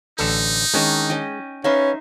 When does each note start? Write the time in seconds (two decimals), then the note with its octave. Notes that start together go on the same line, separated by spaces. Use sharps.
0.19 A1 D3 D#4 A4
0.74 D#3 G#3 C#4 D4
1.10 C#4 D#5 G5
1.64 C#4 D#4 B4 E5 F5 C6